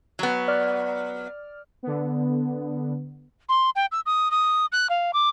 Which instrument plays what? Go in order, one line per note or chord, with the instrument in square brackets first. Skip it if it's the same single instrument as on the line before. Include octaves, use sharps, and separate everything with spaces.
[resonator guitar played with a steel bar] F#3 B3
[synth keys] D5 F6
[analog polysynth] D3 B3
[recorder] C6
G5
E6
D#6
D#6
F#6
F5
D6